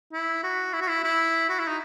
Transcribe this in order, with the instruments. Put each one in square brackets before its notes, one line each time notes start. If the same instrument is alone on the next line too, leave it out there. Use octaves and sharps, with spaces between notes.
[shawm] E4
F#4
E4
F#4
E4
E4
F#4
E4
D#4